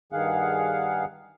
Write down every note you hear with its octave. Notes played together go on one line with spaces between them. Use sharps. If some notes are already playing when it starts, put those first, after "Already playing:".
G2 D#3 G#4 F5 F#5